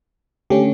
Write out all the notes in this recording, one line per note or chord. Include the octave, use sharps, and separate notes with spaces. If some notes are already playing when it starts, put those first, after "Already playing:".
D3 A3 C#4 G4